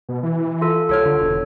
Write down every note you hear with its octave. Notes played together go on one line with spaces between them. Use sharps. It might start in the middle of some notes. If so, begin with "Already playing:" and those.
B2
E3
F4 A4
C2 A4 C#5 F6
D3
E1